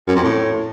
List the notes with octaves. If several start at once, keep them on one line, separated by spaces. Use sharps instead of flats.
F#2
F2
A2